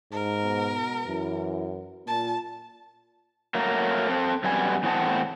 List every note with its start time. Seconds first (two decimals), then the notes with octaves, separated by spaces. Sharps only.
0.12 G#2 A#4
0.43 B2 B3
1.07 F#2 E3 E4
2.07 A#2 A5
3.55 F#3 A3 A#3 A#4
4.09 C4 A4
4.44 F#2 G3 B3 G#5
4.83 E2 A2 C4 G#4 F#5 A5